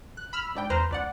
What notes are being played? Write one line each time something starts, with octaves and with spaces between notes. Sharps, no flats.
F#6
B5 E6 F6
G#2 D4 G5
E2 B4 C5 A#5 F6
C#2 D5 F#5